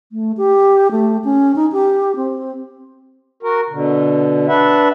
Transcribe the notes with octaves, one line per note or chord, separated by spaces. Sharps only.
A3
G4
A3
C#4
D#4
G4
C4
F#4 A#4
B2 D3
D4 B4 E5 F#5